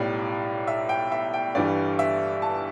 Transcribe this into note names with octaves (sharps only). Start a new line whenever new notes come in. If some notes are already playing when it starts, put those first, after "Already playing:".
Already playing: B1 A2 G3 D5
E5
G5
E5
G5
G1 G2 E3 G3 D5
E5
A5